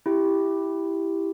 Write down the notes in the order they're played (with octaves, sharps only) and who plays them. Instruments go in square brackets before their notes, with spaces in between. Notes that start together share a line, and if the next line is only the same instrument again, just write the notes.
[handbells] E4 G4